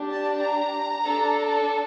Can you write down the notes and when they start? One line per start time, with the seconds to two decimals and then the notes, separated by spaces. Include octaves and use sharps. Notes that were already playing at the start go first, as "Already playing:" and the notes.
Already playing: D4 G4
0.11 A5
0.41 A#5
1.03 D4 A4